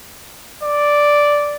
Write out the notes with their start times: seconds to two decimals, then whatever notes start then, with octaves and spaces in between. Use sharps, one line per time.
0.63 D5